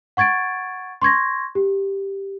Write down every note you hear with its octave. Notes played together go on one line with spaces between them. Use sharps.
F#5 C#6 G#6 A6 D7
C6 C#6 G#6 A#6
G4